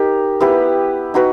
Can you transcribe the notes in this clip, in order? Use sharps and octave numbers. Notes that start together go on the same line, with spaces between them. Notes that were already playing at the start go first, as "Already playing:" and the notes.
Already playing: D#4 G4 A#4
B3 E4 G4 B4
D#4 F#4 B4